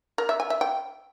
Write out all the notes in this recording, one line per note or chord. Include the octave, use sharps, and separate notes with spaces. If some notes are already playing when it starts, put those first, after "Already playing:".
A#4
E5
G#5
E5
G5